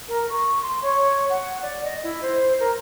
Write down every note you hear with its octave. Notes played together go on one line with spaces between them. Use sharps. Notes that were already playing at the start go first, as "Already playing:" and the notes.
A#4
C#6
C6
C#5
F#5
D5
D#5
E4
C5
A#4